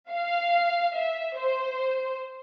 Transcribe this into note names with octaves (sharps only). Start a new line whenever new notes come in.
F5
E5
C5